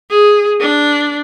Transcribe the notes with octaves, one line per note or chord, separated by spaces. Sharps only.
G#4
D4